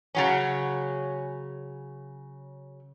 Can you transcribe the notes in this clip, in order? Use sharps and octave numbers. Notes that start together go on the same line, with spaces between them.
C#3 F#3 C#4